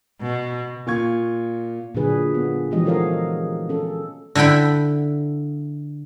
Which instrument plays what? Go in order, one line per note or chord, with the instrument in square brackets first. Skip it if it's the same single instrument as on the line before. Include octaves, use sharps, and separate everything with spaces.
[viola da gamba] B2
[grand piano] A#2 F4 C#6 G#6
[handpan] A#2 D3 F#3 D4 G#4 B4
B3
E3 F3 G#3 G4 D#5
F#4 A4 A#4 C#5 D#5 F5
C#4 A4
[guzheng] D3 E4 F#5 G5 B5